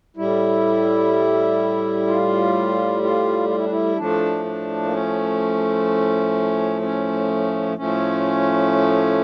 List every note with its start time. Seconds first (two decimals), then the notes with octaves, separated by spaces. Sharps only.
0.17 A2 G3 E4
2.07 F4
3.03 F4
3.49 F4
3.57 E4
3.64 D4
3.72 E4
3.97 A2 F3 A3 D4
4.45 D4
4.84 A#3
4.92 C#4
6.82 C#4
7.77 A2 F3 A3 C#4